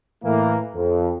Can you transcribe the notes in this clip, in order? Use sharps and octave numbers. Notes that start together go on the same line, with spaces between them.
A2 E3 A#3
F2